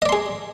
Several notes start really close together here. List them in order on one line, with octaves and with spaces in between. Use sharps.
D#5 D5 C6 G#4